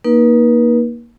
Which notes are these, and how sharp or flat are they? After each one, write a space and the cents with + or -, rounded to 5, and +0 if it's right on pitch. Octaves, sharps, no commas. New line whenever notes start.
A#3 +10 D#4 +5 B4 -40